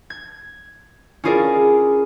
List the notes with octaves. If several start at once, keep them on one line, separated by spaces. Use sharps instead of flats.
G#6
C#4 E4 F4 G#4 A#4 D5